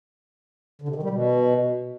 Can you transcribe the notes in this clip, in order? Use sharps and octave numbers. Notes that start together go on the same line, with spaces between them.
D3
C3
D#3
G3
B2